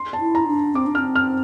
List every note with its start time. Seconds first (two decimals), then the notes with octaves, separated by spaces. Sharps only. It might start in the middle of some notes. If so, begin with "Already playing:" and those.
Already playing: C6
0.13 A5
0.21 E4
0.35 A#5
0.47 D4
0.74 C4 D6
0.86 D4
0.95 C4 F6
1.15 F6